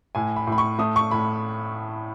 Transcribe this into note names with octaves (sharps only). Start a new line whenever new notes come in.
A2 G#5
B5
A2 B5
C#6
A3 D#6
C#6
A2 B5